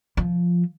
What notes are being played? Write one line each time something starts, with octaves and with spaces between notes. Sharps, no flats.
F3